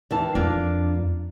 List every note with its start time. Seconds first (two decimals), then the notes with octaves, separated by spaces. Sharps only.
0.11 D#2 E3 A5
0.35 F2 A#3 D4 F4